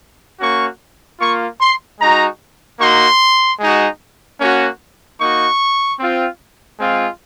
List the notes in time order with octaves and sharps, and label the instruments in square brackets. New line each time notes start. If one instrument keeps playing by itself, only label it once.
[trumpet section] A#3 C#4 F#4 C#6
A#3 F4 C#6
C6
G#3 D#4 F#4 A#5
A#3 D#4 F#4 C6
G#3 D#4 F#4
A#3 C#4 F#4
A#3 D#4 F#4 C#6
C4 F4
G#3 C4 F4